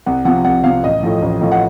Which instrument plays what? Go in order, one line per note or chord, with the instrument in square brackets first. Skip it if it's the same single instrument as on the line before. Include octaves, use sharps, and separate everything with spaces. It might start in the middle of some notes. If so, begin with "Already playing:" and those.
[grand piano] C2 F#5
C3 F3 F#5
C2 F#5
C3 F3 F5
A1 D#5
A2 F3
A1
A2 F3
F#5